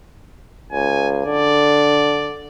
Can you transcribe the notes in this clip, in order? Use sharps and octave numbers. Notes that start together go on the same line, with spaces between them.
C#2 G#5
D3 D5